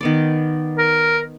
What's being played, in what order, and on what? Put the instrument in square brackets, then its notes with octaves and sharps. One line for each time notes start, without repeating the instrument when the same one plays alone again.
[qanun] D#3 B3 D5
[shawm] A#4